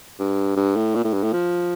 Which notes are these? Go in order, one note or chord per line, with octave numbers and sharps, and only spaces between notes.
G2
G2
A2
A#2
A2
G2
A2
F3